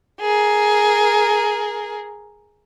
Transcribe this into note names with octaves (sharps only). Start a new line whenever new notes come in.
G#4 A#4